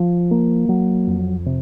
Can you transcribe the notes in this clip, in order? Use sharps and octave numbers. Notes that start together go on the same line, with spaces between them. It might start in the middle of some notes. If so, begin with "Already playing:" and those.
Already playing: F3
A#3
F#3
F2
C3